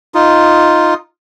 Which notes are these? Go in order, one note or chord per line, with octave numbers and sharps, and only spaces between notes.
D#4 F4